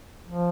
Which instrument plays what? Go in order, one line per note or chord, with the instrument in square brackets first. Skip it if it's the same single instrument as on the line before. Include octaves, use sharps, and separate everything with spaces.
[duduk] F3